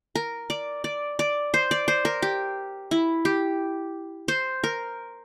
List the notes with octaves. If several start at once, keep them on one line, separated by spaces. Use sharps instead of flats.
A#4
D5
D5
D5
C5
D5
C5
A#4
G4
E4
G4
C5
A#4